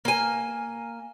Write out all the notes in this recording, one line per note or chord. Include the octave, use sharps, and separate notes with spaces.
A#3 G#5